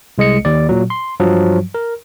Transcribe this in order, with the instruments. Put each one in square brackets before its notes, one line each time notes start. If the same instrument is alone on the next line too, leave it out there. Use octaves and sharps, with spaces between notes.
[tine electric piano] C2 G#3 D#5 C#7
D#2 D5
A#2 F#3
C6
G2 F3 F#3
A#4